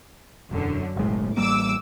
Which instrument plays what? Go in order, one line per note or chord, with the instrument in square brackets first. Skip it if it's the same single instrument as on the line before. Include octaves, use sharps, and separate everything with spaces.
[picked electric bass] E1 [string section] F#2 D3
[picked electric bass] F#1 B1 G#3 [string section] A2
[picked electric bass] A1 G3 A#3 [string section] D6 E6